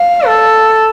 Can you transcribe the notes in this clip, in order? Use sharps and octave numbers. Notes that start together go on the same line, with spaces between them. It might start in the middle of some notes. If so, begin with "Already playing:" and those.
Already playing: F5
A4